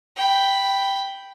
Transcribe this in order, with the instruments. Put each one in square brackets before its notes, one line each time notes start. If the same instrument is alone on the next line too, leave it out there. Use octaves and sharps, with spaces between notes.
[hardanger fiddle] G5 B5